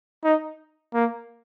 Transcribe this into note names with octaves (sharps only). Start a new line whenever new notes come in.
D#4
A#3